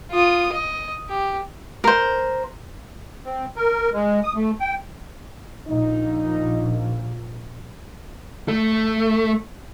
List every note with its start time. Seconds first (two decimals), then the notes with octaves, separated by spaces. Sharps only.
0.11 F4 D#6
0.52 D#5
1.09 G4
1.84 A#4 C5
3.25 C4
3.56 A#4
3.94 G#3
4.23 D#6
4.35 A3
4.60 G5
5.68 A#1 D#4
8.48 A3